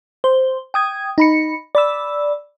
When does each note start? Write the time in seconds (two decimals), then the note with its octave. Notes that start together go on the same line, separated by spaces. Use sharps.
0.24 C5
0.74 G5 D#6 G#6
1.18 D#4 B5 C#7
1.75 D5 B5 E6